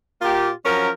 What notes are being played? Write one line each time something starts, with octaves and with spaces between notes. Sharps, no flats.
A#2 A#3 F4 G4
F3 F#3 C#4 A#4